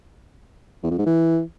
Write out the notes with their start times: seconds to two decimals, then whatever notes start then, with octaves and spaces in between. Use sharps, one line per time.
0.83 E2
0.91 F2
0.98 G#2
1.06 E3